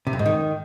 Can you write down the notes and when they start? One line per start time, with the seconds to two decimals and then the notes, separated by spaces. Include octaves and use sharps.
0.07 C3
0.13 F2
0.19 G#2
0.26 D#3